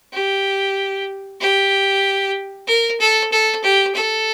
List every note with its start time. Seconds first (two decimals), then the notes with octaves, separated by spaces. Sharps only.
0.13 G4
1.41 G4
2.68 A#4
3.00 A4
3.32 A4
3.64 G4
3.95 A4